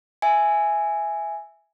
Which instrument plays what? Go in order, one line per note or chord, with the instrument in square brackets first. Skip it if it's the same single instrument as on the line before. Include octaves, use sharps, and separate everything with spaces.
[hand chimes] E5 G#5